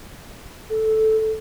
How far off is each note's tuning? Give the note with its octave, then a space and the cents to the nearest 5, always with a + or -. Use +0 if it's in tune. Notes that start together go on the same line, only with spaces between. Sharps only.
A4 -10